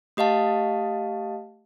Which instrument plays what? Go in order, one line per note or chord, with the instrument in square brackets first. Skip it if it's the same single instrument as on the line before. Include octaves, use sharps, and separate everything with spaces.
[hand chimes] A3 G4 D#5 F5 A5